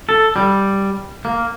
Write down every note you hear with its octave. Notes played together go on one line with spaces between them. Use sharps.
A4
G3
A#3